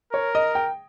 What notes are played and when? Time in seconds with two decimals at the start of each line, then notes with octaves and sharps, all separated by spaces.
0.13 A#4 C#5
0.35 D#5
0.55 G5